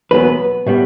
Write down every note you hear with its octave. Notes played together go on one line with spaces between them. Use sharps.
E2 B2 F#3 B3 B4
A2 G3 B3